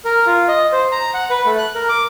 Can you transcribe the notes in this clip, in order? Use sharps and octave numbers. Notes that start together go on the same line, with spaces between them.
A#4
F4
D#5
C5
A#5
F#5
B4
A3
F#6
A#4
D6